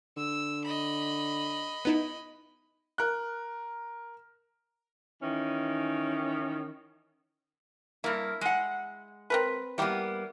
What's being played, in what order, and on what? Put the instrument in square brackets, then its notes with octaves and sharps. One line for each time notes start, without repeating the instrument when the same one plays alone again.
[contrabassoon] D3 [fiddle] E6
[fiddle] D#5 B5
[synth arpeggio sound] B3 D#4 E4
[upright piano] A#4 F#6
[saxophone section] D#3 E3 C#4
[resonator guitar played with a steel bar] G2 A#3 [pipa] E4
[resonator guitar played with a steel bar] G#3 F#5
[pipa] C4 A#4 B4
[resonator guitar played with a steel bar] G3 A#3 B3 [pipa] E4 G4